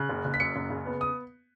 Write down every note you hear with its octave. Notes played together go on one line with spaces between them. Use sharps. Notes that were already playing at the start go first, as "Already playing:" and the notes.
Already playing: C#3 F#6
F#1
F#1
B6
F#2 C#7
F#1
C#3
B3
D#6